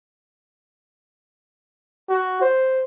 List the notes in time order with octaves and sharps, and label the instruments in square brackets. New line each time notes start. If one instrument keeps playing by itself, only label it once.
[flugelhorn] F#4
C5